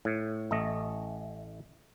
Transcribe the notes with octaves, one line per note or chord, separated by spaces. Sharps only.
A2
A1 A3 D#5